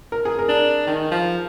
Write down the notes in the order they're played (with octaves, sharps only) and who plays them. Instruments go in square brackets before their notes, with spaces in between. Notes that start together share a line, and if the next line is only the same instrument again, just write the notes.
[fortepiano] A#4
G#4
A#4
[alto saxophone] D4
D#3
F3